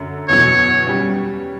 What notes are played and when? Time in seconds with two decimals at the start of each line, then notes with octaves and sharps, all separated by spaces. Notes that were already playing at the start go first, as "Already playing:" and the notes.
Already playing: F#2 D3 A3
0.28 E2 B2 F#3 C#5
0.87 G3 C#4